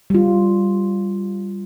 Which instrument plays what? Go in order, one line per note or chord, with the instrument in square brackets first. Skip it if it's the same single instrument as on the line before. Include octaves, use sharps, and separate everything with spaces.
[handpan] G3 F4